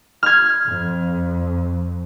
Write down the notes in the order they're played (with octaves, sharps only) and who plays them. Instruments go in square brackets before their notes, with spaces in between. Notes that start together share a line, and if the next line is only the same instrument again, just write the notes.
[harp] F6 G#6
[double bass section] F2